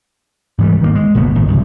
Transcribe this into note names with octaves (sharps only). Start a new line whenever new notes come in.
G#2 E3 F#3 G3
D#3 G#3 A#3
G#3
G1 A#2 C#3 B3
G#1 A#2 D#3
F#1 C2 G#2